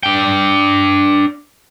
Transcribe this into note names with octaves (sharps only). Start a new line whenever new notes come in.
D4 G5